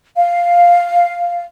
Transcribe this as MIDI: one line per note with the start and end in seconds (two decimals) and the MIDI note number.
0.16 1.43 77